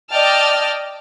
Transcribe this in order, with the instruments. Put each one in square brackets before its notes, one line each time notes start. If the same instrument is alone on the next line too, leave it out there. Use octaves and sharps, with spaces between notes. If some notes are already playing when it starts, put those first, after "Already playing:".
[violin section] D5 D#5 G5 A5 F6